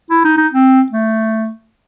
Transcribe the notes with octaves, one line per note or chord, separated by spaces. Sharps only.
E4
D#4
D#4
C4
A3